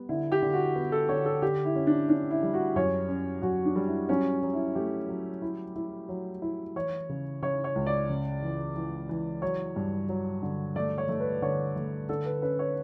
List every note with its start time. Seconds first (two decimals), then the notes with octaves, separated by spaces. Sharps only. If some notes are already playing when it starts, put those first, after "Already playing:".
Already playing: G3 B3
0.09 D3 E4
0.32 G4
0.42 D3
0.53 F#4
0.76 B3
0.92 A4
1.09 D3 C#5
1.26 A4
1.42 D3 G4
1.65 E4
1.76 C#4
1.87 D4
2.09 C#4 D4
2.31 E4
2.43 G3
2.54 F#4
2.76 F#2 C#5
3.09 C#4
3.42 F#2 F#4
3.65 D4
3.76 G3
3.87 E4
4.09 F#3 C#4
4.43 F#3
4.53 E4
4.75 A3 G4
5.09 F#3
5.42 E4
5.76 E4
6.09 F#3
6.42 E4
6.76 E3 C#5
7.09 C#3
7.42 C#3 C#5
7.64 C#5
7.75 C#2
7.86 D5
8.09 C#3
8.42 E3
8.76 E3
9.09 E3
9.42 F#3 C#5
9.76 G2
10.09 F#3
10.42 D3
10.76 A3 D5
10.98 C#5
11.09 A3
11.20 B4
11.42 D3 C#5
11.76 A3
12.09 D3 A4
12.26 B4
12.42 C#4 B4
12.59 C#5